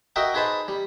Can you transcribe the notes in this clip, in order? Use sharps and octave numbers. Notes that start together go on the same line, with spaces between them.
F#4 A#4 D#5 E5 G5
D#4 G#4 B4 C5 A5
G3